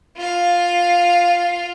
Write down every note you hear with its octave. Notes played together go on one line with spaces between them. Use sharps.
F4 F5